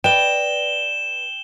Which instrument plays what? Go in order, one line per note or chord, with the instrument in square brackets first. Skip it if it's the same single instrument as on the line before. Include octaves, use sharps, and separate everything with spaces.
[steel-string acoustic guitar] B4 D5 D#5 [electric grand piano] G5 [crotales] E7 G7